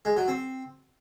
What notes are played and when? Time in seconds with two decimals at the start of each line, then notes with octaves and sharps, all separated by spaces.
0.05 G#3
0.17 F#3
0.28 C4